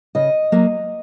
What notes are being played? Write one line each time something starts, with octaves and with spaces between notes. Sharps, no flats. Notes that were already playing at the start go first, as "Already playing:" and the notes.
C#3 D#5
F#3 A#3